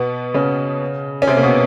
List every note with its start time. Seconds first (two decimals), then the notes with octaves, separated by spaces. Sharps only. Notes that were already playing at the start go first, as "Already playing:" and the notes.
Already playing: B2 B3
0.34 C#3 C#4
1.22 C#4
1.27 C3 C4
1.37 A#3
1.43 B2 B3